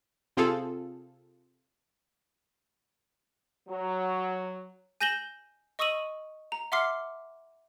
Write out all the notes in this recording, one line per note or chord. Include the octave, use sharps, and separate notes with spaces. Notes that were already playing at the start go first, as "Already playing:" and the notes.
C3 C4 F4 G#4 A4
F#3
G#5 G6 A#6 E7 F#7 G7
D#5 C#6 D#6 E6 D#7 F#7
A#5
E5 F#5 C6 D6 F6 C7